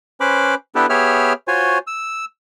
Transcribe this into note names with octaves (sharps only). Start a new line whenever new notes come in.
C#4 B4 C5 B5 D6
B3 D4 E4 G4 A4 B4
B3 G4 G#4 C#5 E5 F6
F4 F#4 C5 C#5 G#5
E6